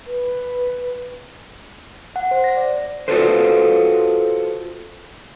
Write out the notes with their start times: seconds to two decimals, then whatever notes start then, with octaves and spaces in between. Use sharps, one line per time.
0.06 B4
2.16 F#5
2.31 C5
2.44 A#6
2.57 D5
3.08 F4 F#4 A4 B4 C5